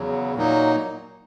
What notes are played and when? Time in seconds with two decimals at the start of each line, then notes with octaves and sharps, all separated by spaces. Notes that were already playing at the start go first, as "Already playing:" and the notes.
Already playing: E2 C#3 F#3
0.34 A#2 F#3 A#3 D#4